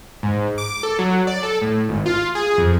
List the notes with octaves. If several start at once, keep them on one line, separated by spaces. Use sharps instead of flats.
G#2
D6
A4
F#3
D5
A4
A2
G#1
F4
G#4
F2